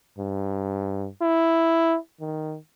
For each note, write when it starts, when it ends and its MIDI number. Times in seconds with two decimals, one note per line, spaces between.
0.18 1.08 43
1.22 1.97 64
2.20 2.56 51